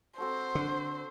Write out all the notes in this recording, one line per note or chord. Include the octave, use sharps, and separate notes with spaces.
C4 F#4 A4 C5
D3